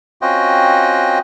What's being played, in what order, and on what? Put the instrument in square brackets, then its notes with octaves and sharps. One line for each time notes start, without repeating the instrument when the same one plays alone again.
[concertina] C4 C#4 F4 F#4 D#5 G5